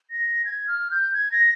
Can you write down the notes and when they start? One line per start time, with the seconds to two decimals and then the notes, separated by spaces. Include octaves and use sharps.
0.11 A#6
0.45 G#6
0.68 F6
0.91 G6
1.14 G#6
1.31 A#6